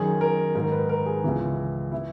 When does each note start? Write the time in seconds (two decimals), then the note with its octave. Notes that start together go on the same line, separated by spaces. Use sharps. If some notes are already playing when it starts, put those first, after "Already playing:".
Already playing: F#2 D#3 G#4
0.21 A#4
0.55 G#2 D#3 A#4
0.72 B4
0.89 A#4
1.06 G#4
1.24 C#2 C#3 E3
1.92 E3 E4